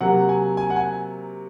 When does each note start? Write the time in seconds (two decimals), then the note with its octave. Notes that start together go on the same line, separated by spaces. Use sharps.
0.01 C3 F#3 A#3 F#5
0.29 G#5
0.57 G#5
0.70 F#5
0.76 G#5